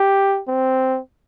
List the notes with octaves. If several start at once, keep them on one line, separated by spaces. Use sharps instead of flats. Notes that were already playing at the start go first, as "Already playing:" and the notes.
Already playing: G4
C4